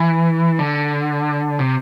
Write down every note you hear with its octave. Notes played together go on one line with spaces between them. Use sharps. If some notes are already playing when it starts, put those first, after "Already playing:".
Already playing: E3
D3
C3